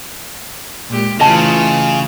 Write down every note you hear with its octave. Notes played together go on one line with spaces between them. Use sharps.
A#2 G#3 G4
C#3 E3 A3 F4 D#5 A5